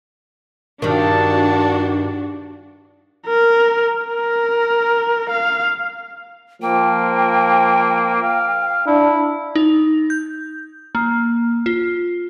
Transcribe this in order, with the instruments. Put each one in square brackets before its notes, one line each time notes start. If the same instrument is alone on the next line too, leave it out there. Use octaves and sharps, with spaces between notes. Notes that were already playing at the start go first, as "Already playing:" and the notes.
[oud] G2 D#3 [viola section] D4 F#4 [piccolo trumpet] A5
[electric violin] A#4
A#4
F5
[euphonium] F3 [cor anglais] A#3 [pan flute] G5
[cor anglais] F5
[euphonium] D4 [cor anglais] E4
[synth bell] D#4
G6
A#3
F4